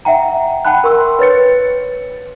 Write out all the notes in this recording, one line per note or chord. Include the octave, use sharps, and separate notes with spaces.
E5 F#5 G5 A#5
F#5 G5 A5 B5 F#6
A#4 C6 C#6 E6
B4 C#5 A6 C#7